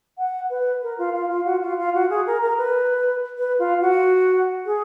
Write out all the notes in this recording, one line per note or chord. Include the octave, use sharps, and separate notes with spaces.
F#5
B4
A#4
F4
F4
F4
F#4
F4
F4
F#4
G#4
A#4
A#4
B4
B4
F4
F#4
G#4